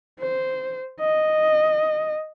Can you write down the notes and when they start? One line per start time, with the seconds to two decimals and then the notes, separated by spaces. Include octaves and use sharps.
0.21 C5
1.01 D#5